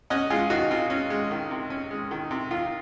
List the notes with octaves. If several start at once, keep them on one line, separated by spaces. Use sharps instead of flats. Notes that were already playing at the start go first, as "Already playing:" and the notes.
C#4 D#5 F#5
G#3 F4 G#4
D#3 D#4 F#4
C3 F4
C#4
G#3
D#3
C3
C#4
G#3
D#3
C3
D#3 F4